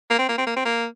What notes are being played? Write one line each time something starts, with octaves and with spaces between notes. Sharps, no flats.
A#3
C4
A#3
C4
A#3
C4
A#3